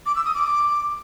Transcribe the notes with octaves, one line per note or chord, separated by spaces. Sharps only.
D6
E6
D#6
D6